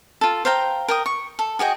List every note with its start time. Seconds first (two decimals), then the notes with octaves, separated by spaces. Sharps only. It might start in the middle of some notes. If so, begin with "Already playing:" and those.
0.21 F4 A4
0.45 C5 F5 G5 A#5
0.88 A#4 G5 D#6
1.06 C#6
1.39 A4
1.59 F#4 G#4 D#5 G5